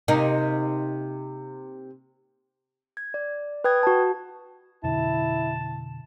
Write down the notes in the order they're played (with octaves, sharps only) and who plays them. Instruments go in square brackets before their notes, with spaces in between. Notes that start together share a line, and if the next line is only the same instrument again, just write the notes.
[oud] C3 A#3 D#4
[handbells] G#6
D5
B4 G5 D#6 G#6
F#4 A5
[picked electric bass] F2 B2 D3 [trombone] E4 [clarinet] A5